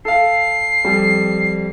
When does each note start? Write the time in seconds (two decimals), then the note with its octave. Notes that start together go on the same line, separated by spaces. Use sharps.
0.05 A4 F5 C7
0.85 F2 G3